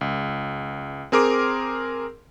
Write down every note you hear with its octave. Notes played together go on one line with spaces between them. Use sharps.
C#2
C4 G#4 A#4 C6 D6 D7